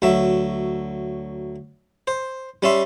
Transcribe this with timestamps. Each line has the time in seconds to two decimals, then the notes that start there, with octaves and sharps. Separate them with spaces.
0.02 D2 F#3 E5
2.07 C5
2.62 G3 C#4 E5 C6